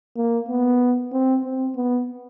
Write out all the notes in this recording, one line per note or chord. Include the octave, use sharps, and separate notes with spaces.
A#3
B3
C4
C4
B3